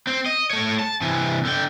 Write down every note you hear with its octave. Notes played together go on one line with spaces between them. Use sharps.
C4
D#5
A3 C#5
A5
C3 E3
D3 G5